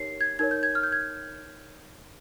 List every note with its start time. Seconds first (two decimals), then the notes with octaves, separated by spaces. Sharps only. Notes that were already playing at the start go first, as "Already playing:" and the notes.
Already playing: D#4 G4 A#4 C#5 C7
0.21 G#6
0.39 D#4 A#4 C#5 G#6
0.51 G6
0.63 G#6
0.75 F6
0.83 G6
0.92 G#6